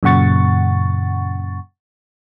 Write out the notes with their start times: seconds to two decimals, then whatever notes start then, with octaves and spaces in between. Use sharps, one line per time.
0.03 F#2 A#2 C#3 F#5 C#6 A6